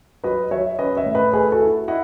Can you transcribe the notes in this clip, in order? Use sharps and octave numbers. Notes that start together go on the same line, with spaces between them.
F#3 B4 D#5
F#3 C#5 E5
C#4 B4 D#5
C#5 E5
A2
B4 D#5
A3 G#4 B4
F#4 A4
E4
E4 D#5 F#5